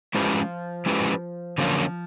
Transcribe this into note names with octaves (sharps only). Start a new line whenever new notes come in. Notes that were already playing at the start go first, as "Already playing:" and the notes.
F3 G#3 C#4 E4 G4 B4
G#3 C#4 E4 G4 B4
D3 F3 F#3 A#3 C#4 F4